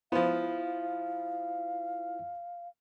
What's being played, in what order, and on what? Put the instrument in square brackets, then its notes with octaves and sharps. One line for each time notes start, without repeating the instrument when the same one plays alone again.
[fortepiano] F3 B3 [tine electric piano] E4 F4 C5 [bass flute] F5